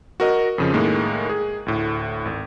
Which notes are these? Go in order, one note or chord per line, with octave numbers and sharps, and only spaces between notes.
F#4 A#4 D#5
F2 C#3 F3
A2 D#3 G#3 A#3
G#4
D2 A2
G#1